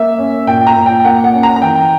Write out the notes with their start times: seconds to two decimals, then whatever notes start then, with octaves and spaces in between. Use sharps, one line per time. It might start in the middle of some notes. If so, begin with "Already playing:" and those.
Already playing: A#3 E5
0.18 C#4
0.47 A#2 G5
0.67 A#5
0.76 A#2
0.86 G5
1.05 A#3 F#5
1.24 F#5
1.33 C#4
1.43 A#5
1.56 A#5
1.62 E3 G5